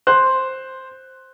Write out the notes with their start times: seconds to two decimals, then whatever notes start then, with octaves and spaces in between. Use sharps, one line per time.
0.07 C5 F#6